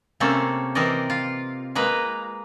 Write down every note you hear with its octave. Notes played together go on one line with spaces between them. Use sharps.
C3 A3 A#3 C4 C#4 A4
E3 C4 G4 A#4 D5 D#5
F4
G#3 A#3 B4 A#5